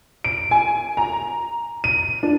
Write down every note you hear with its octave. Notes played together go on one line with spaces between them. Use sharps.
D7
G#5
A#5
D#7
D4